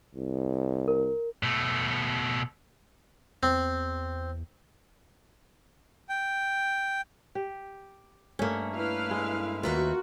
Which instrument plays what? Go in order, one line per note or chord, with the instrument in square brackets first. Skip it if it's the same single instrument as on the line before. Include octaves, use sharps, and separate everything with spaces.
[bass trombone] C2
[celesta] A#4
[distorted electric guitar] B2 A3
[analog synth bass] E2 [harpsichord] C4
[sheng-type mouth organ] G5
[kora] G4
[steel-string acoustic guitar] G2 A3 [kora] A#3 C#4
[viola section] E4 B4 F5
[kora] G#3
[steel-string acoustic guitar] D#2 B4 E5 [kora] F4 A#4 [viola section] F#4